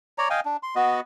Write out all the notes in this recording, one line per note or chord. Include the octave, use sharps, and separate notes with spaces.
C#5 D5 A#5
D#5 F5 G5 G#5
D4
C6
B3 F#4 D#5